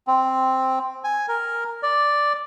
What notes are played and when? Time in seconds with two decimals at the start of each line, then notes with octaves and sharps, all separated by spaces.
0.07 C4
1.04 G#5
1.28 A#4
1.83 D5